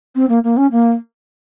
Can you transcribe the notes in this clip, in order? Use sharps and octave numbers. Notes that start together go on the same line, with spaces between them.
C4
A#3
A#3
C#4
A#3